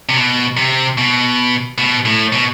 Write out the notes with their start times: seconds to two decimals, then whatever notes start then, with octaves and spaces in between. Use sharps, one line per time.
0.09 C3
0.17 B2
0.57 C3
0.98 B2
1.78 B2
2.05 A2
2.33 B2